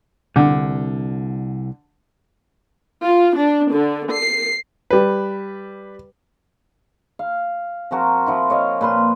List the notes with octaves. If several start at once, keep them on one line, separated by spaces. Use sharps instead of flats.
C2 D3
F4
D4
D3
C7
G3 B4
F5
F3 C4 F#4 A#4
F3 E4 F#4
C#5 D#5 F5
A#2 B4 C6